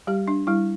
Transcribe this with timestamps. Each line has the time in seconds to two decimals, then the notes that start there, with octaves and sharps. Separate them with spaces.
0.07 G3 G4
0.28 D4
0.47 G3 E4